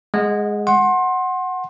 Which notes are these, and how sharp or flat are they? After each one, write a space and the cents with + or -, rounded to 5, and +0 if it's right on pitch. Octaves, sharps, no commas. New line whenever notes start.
G#3 +0 D#5 +40 F#5 -15
F#5 +0 C6 +25